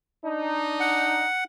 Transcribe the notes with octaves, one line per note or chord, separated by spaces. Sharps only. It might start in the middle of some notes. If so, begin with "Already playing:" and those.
D4 D#4
F#5